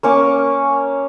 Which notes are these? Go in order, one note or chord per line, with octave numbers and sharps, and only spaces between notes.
A#3 C#4 C#6 D6